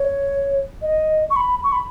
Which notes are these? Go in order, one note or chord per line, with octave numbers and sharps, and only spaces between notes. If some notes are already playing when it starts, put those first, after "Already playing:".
Already playing: C#5
D#5
C#6
B5
C#6
B5